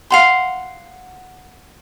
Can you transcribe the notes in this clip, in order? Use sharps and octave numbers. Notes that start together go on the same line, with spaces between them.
F5 F#5 C6